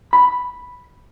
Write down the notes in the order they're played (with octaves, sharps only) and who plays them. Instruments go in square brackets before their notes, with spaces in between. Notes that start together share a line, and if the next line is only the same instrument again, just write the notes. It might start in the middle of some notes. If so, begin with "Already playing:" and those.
[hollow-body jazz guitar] B5